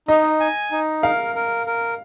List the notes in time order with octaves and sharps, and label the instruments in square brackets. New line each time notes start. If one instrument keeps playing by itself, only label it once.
[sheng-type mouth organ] D#4 [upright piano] D#5
[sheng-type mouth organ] G#5
D#4
[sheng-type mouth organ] A#4 [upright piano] F5
[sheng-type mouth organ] A#4
A#4